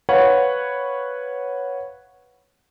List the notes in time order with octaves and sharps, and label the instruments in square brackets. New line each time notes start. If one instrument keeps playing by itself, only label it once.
[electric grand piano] B4 C#5 F5 F#5